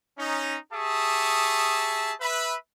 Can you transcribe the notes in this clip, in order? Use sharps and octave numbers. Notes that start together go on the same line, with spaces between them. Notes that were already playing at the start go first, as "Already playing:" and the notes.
C#4 D#4
G4 G#4 E5 A5 C#6 D#6
B4 E5 B5